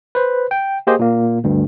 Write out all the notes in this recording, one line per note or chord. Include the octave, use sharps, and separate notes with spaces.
B4 C5
G5
A#3 G4 G#4 C5 D#5
A#2 A#3
D2 G2